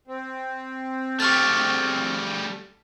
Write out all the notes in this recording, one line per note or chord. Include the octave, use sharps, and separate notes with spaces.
C4
G3 A3 C#6 F6 A6